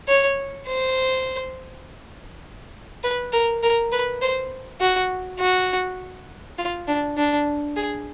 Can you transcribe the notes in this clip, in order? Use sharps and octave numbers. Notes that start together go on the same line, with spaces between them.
C#5
C5
B4
A#4
A#4
B4
C5
F#4
F#4
F4
D4
D4
G#4